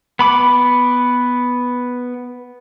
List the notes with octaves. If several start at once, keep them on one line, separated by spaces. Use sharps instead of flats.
B3 B5 D6